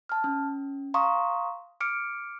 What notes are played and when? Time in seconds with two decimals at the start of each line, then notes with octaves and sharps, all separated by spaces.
0.09 A5 F6
0.24 C#4
0.94 F5 A#5 C6 C#6 D#6
1.81 D6 F6 C#7 D7